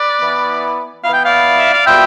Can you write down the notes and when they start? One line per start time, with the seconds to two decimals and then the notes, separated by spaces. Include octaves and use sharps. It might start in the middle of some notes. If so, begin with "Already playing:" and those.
Already playing: B4 D5
0.21 E3 B3 E4
1.04 E3 B3 E4 F5
1.14 G5
1.26 D5 F5
1.59 E5
1.73 F5
1.86 B2 G3 B3 F4 E5 G5